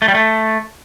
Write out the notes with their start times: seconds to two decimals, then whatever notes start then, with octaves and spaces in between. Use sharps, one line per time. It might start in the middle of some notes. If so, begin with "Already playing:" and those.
0.02 A3
0.08 G3
0.15 A3